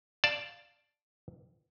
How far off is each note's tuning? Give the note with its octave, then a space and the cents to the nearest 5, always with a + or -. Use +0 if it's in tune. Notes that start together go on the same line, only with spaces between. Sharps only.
D5 +0 F5 +0 A5 +0